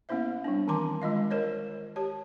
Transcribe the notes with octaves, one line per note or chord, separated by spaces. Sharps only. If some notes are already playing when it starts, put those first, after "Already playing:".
A#3 B3 C#4 E4 C5 E5
G3 C4 D4
D#3 E3 G#5 A5 C6 D6
G#3 F4 D#5 F5
A#4 C5 C#5 D#5
G4 C#5 A5